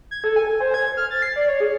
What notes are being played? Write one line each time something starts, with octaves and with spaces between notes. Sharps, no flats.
G#6
A4
G#5
C5
G#6
F6
A6
C7
D5
C#5
G#4